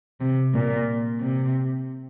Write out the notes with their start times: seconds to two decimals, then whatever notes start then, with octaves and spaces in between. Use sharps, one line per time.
0.20 C3
0.54 A#2
1.20 C3